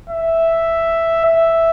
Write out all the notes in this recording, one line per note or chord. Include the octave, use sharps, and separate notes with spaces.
E5
E5